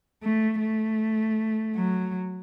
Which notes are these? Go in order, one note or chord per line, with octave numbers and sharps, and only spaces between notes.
A3
A3
F#3